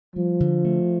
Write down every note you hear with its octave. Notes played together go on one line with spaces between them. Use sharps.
F3 G3
D3
A3